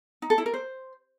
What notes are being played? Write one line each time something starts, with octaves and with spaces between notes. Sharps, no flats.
D#4
A4
E4
A#4
C5